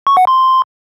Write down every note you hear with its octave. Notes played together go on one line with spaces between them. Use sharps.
C#6
F#5
C6